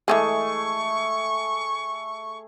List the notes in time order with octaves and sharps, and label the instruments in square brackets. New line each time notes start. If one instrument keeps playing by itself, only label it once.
[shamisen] E3 F#3 G#3 [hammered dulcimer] A3 G#4 [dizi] C#6